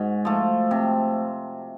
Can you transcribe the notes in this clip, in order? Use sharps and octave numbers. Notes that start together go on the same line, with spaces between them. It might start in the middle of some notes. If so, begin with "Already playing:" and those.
Already playing: G#2 F#4
F3 A3
C3